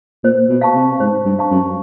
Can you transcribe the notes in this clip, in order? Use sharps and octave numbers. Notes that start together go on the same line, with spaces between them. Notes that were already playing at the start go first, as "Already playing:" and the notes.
A#2 C5
B2
F5 A5 C#6
C3
G#2 C5
G2
F5 A5 C#6
F#2